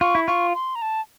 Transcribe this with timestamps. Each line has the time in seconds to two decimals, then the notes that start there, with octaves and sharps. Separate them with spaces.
0.01 F4 C#6
0.15 E4
0.28 F4 C#6
0.55 C6
0.75 A#5
0.82 A5